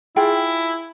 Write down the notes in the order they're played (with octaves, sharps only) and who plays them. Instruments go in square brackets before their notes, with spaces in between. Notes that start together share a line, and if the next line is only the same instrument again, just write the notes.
[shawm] E4 [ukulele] F4 G#4 G5